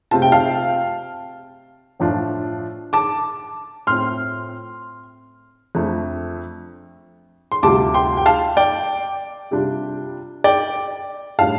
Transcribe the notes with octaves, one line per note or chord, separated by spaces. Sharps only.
C3 A3 C4 F4 A5
G5
F5 A5
A2 F3 A3 D4 F4
A5 D6
A2 A3 C4 F4 C6 F6
F2 F3 A3 D4 F4
C6
D2 C3 G3 F4 A5 D6
G5 C6
G5
F5 A5
D5 G5
C3 G3 D4 F4
D5 G5
A2 G3 D4 F4 F5 A5